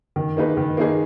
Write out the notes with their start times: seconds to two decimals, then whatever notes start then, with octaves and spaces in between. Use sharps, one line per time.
0.16 D#3
0.37 A#3 D#4 G#4 B4
0.57 D#3
0.77 A#3 D#4 G#4 B4